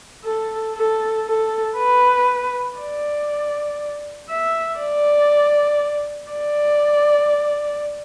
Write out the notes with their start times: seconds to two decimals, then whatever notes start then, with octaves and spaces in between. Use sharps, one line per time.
0.25 A4
0.75 A4
1.26 A4
1.77 B4
2.78 D5
4.29 E5
4.80 D5
6.31 D5